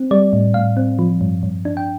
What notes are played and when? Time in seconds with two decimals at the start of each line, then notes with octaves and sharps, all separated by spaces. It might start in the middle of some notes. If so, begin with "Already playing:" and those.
Already playing: C4
0.11 G3 D5
0.33 A2
0.54 A2 F5
0.77 C4
0.99 F3
1.21 G2
1.43 G2
1.65 D4
1.77 G5